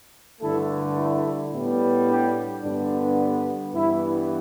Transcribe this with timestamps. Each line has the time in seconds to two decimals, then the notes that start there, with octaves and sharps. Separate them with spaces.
0.41 G2 D3 A3 E4 A4
0.97 E4 A4
1.53 A2 G3 B3
2.08 D4 G4
2.63 G2 D3 B3 D4
3.74 G2 E3 B3 E4